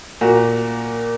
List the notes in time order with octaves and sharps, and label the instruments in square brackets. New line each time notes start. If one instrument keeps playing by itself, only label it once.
[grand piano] A#2 A#3 F#4